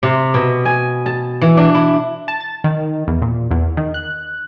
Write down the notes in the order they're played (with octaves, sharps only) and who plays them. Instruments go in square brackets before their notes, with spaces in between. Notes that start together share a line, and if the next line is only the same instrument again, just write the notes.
[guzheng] C3
B2
G#5
A5
E3
D4
E4
[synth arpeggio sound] A5
A6
D#3
E2
A#2
E2
D#3
F#6